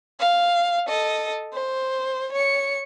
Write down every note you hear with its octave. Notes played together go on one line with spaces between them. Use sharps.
F5
A4 D#5
C5
C#5 C#7